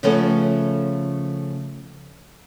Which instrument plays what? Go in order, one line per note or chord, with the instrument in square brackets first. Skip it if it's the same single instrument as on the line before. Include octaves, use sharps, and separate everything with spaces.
[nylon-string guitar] C#3 F3 A3 B3 C#4 A4